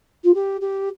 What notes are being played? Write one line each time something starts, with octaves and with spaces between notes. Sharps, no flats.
F4
G4
G4